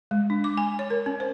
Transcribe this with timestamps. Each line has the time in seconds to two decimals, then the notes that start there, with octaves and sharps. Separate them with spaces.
0.11 G#3
0.30 D4
0.44 D6
0.57 G#5
0.79 C#5
0.90 A#4
1.06 C#4
1.20 C5